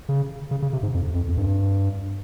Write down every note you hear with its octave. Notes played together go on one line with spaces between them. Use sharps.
C#3
C#3
C#3
C3
G#2
F2
F2
F2
G2